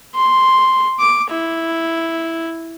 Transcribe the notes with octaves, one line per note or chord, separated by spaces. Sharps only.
C6
D6
E4